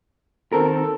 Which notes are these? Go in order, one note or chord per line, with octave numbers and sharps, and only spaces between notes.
D#3 C4 A4 A#4